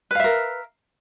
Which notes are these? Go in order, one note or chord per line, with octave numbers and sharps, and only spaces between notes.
A#4 B4 E5 F5